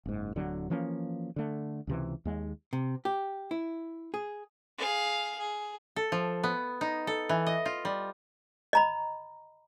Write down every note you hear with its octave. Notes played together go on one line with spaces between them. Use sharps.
F#1 G#2
D1 D3 F#3
E3 F3 A#3 C#4
D3 A3
C#2 C3 E3
D#2 G#3
C3
G4
E4
G#4
G#4 F5
G#4
A4
F3
B3
D#4
A4
E3
D#5
F4
G3
D#5 A#5 B5